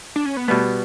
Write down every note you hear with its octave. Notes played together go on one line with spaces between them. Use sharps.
D4
C#4
B3
B2 G3 A3 B3